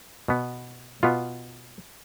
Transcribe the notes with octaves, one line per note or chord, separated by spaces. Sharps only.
B2 B3
B2 B3 F4